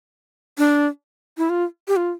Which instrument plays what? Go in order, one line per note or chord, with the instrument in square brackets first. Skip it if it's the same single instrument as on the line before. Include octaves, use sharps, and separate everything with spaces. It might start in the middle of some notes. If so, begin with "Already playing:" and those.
[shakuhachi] D4
E4
F4
G4
F4